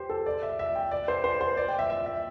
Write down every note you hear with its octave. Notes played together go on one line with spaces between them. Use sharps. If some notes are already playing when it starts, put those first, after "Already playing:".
Already playing: G4 C5
A4
D5
E5
E5
G5
D5
C5
C5
C5
D5
G5
E5
E5
E5